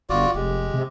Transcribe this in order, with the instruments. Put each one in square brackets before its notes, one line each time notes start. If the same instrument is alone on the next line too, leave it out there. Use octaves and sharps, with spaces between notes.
[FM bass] G1 [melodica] F4 F#4 D5
[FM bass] F1 [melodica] G#3 G4
[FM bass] C3